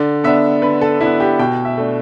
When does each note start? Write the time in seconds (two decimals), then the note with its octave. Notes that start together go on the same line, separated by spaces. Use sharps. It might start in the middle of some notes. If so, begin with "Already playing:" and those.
Already playing: D3 D5
0.24 B3 D4 E5
0.62 D3 B4
0.81 A4
1.01 B3 D4 E4
1.20 G4
1.39 B2 G5
1.65 E5
1.78 A3 D4